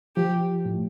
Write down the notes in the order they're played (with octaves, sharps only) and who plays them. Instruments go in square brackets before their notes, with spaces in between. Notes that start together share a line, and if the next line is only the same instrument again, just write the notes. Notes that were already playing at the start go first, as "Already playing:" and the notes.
[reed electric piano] F3 [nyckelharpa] G4
[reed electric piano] A2